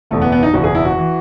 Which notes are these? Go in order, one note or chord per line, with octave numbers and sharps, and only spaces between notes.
F#1 E2 B2 A3
B3
B3
D#4
F#1 E2 B2 F#4
G#4
E4
F#4
E3